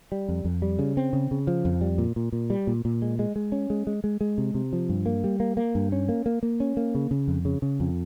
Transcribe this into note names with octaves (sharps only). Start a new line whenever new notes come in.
G3
F2
F2
G3
C#3
C4
C#3
C#3
F3
F2
G3
A#2
A#2
A#2
G3
A#2
A#2
G#3
G#3
G#3
C#4
G#3
G#3
G#3
G#3
C3
C3
F3
G2
A#3
G3
A#3
A#3
G2
C#4
A#3
A#3
A#3
C#4
A#3
C#3
C#3
F2
C#3
C#3
F2